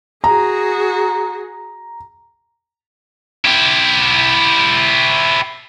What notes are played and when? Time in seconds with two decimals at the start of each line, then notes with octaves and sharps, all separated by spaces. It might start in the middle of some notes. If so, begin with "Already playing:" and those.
0.24 F#4 G#4 A#5
3.45 E4 G4